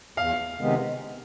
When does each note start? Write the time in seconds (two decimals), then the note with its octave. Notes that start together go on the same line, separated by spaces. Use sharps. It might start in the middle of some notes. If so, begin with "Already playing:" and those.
0.17 E2 F5
0.59 C3 D#3 G#3 B3